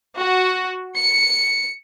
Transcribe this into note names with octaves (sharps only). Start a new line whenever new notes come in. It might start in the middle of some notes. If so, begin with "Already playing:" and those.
F#4
C#7